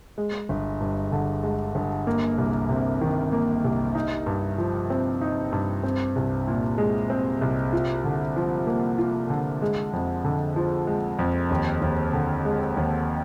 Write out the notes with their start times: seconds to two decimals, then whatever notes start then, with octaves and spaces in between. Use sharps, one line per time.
0.18 G#3
0.49 G1
0.81 G2
1.12 D3
1.43 G#3
1.75 G1
2.07 A#3
2.38 C2
2.69 C3
3.01 D#3
3.32 A#3
3.64 C2
3.95 D#4
4.26 G2
4.58 F3
4.90 C4
5.22 D#4
5.52 G2
5.83 C4
6.16 C2
6.48 A#2
6.78 G#3
7.10 C4
7.41 C2
7.73 F4
8.04 D3
8.36 F3
8.67 A#3
8.98 F4
9.30 D3
9.62 G#3
9.93 F2
10.25 D3
10.56 F3
10.87 G#3
11.19 F2
11.51 D#2
11.81 D#2
12.13 D3
12.45 G#3
12.77 D#2